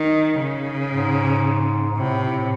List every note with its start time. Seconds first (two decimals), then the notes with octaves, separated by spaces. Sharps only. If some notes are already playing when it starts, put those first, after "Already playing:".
Already playing: D#3
0.39 C#3
0.91 G#2
1.91 G#2
1.97 A2 C3
2.23 A2